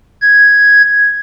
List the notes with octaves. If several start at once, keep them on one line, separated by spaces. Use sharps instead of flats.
G#6